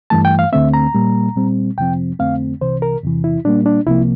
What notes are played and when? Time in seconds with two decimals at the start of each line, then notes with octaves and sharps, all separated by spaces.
0.10 G2 E3 A3 A5
0.25 G5
0.39 F5
0.52 D2 D3 A3 C4 E5
0.74 A#5
0.95 A#2 G3 A#3
1.36 A#2 G3 C4
1.78 F2 C3 F3 C4 G5
2.19 F2 D3 A3 C4 F5
2.61 C2 C3 E3 C5
2.82 A#4
3.03 E2 C3 E3
3.24 E4
3.44 A#2 G3 A#3 D4
3.66 D4
3.87 C2 C3 F3 A#3 E4